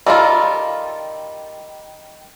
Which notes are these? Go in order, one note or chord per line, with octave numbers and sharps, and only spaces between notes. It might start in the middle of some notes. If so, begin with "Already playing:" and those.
D#3 G3 D#4 F4 A4